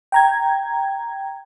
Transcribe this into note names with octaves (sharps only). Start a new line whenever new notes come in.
G5 A#5 G#6